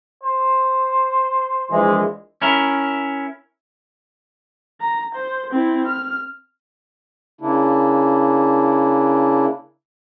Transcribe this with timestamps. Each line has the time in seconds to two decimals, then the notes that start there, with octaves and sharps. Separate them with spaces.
0.23 C5
1.71 A#1 E3 G#3
2.42 C#4 E4 A#4
4.81 A#5
5.15 C5
5.51 C4 E4
5.87 F6
7.41 C#3 A#3 D4 E4